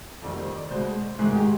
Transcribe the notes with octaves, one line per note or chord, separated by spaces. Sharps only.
F2 D#3 G3 D5
C5
D5
B2 G#3 C5
G#2 D#3 G#3 G#4
G4